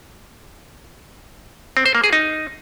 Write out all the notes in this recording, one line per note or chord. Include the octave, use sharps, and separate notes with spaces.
C4
C5
A#3
G#4
D#4